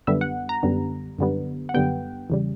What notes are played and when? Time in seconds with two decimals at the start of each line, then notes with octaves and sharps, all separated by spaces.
0.07 F#2 D3 G3 B3 E5
0.21 F#5
0.49 A#5
0.63 F#2 D3 G3 B3
1.19 F#2 D3 G3 B3
1.69 F#5
1.74 F#2 D3 G3 B3 G5
2.30 E2 C#3 G3